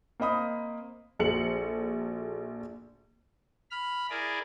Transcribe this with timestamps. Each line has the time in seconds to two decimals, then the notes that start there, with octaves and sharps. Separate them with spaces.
0.20 A#3 C4 D#5 B5 D#6
1.19 A#1 F#4 A4 C#7 F#7
3.71 B5 F6
4.10 E4 G#4 A#4 D5